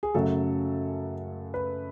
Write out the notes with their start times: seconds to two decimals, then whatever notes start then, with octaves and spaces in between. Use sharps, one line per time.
0.03 G#4
0.14 F#2 C#3 F#3 A3 A4
1.54 B4